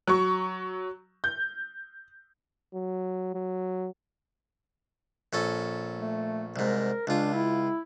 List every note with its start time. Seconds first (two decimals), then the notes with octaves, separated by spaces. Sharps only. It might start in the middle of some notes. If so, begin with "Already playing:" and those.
0.07 F#3 C#6
1.24 G6
2.74 F#3
3.34 F#3
5.33 A#1 C#4 A4
5.97 A3
6.56 C2 G#2 A#4
7.07 C#2 D4 F4
7.33 E4